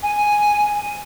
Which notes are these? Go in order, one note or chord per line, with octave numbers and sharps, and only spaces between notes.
G#5